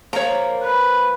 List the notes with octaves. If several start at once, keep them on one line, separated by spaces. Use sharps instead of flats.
F3 A#3 C#5 A#5
B4